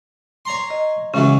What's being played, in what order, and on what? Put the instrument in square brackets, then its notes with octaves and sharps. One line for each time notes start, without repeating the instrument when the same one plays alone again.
[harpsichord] C#5 A#5 C6
[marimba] D#5
[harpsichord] C#2 E3 F#3 [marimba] C#3 C#4